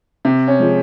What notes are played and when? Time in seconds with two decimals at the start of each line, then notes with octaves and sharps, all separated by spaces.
0.25 C3
0.48 C#4
0.59 F3 G#3